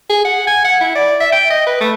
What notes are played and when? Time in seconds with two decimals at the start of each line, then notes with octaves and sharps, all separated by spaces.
0.09 G#4
0.25 F#5
0.47 G#5
0.64 F#5
0.81 E4
0.95 D5
1.20 E5
1.32 G5
1.50 D#5
1.67 B4
1.81 A3